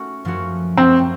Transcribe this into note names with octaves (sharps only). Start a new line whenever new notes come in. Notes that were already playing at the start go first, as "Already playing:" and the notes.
Already playing: A3 C#4 F#4
F#2 F3 A3 C#4 F#4
F#2 F3 A3 C4 C#4 F#4